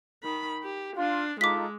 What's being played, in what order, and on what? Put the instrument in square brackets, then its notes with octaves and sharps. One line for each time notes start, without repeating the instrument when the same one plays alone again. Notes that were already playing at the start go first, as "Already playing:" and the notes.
[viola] D#3 B5
G4
[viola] D4 [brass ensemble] F4
[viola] G#3 [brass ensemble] D#4 F4 A4 [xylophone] D6 B6